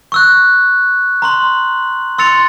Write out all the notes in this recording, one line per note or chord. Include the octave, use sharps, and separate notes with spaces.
C#6 E6 F#6
A#5 C6 F#7
C6 E6 A6 C#7 F7